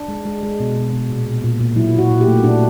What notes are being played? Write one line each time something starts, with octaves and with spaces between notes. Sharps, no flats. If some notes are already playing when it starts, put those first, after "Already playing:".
Already playing: D4
G#3
G#3
G#3
B2
B2
B2
A#2
A#2
A#2
A#2
F#3 E4
A#2 F#4
A#2
G4
A3
A#2 D4